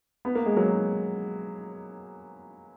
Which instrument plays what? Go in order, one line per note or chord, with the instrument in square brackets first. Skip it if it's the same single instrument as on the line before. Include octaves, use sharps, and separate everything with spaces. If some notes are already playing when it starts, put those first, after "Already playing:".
[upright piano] B3
A#3
G#3
F#3 A#3